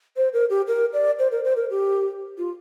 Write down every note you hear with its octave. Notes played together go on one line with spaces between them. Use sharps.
C5
A#4
G4
A#4
D5
C5
A#4
C5
A#4
G4
F4